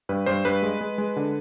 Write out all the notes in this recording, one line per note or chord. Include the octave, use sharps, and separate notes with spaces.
G2 B4
G2 C5
G2 B4
G#3
G#3
G#3
D3